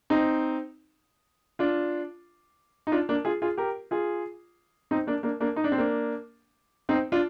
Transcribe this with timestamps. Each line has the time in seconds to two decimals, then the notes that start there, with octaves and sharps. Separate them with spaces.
0.10 C4 D#4
1.59 D4 F4
2.87 D#4
2.92 D4 F4
3.09 A#3 D4
3.25 F4 G#4
3.42 F4 G#4
3.57 G4 A#4
3.91 F4 G#4
4.91 C4 D#4
5.07 A#3 D4
5.23 A#3 D4
5.40 A#3 D4
5.56 D#4
5.64 D4
5.72 C4
5.78 A#3 D4
6.89 C4 D#4
7.12 D4 F4